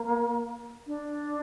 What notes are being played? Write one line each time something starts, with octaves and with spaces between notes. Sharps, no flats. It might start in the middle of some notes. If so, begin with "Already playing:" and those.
Already playing: A#3
D4